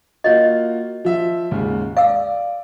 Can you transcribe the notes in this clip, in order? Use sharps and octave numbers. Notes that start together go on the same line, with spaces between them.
A#3 F4 F#4 C#5 D#5
F3 E5
D#2 G#2 C#3
D5 F5 E6